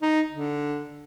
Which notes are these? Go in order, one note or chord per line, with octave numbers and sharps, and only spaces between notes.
D#4
D3